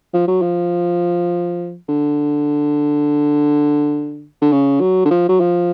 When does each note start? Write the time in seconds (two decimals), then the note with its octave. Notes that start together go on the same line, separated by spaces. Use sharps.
0.14 F3
0.28 F#3
0.42 F3
1.89 D3
4.42 D3
4.52 C#3
4.81 F#3
5.05 D3
5.11 F3
5.29 F#3
5.40 F3